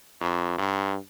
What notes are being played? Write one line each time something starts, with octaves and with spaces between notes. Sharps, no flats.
F2
G2